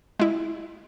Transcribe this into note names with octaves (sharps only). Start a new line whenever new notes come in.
G#3 E4